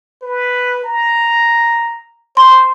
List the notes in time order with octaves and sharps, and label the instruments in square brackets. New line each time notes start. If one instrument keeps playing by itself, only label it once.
[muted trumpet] B4
A#5
[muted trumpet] C5 [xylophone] C6